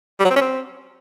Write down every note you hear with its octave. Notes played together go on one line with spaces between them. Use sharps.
G3
F#3
C4
C#4
C4